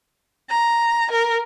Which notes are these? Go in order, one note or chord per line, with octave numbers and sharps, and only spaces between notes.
A#5
A#4